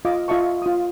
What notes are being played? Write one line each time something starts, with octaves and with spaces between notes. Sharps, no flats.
F4 D#5 F5 D6
F4 D#5 E5 A5 C#6
F4 D#6